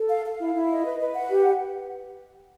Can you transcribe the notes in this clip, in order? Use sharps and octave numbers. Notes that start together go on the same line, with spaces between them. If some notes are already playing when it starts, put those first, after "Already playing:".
Already playing: A4
F5
F5
E4
E4
D#5
B4
B4
F#5
G4